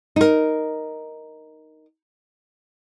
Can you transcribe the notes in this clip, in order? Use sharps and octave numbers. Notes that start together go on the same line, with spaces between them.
D#4 A#4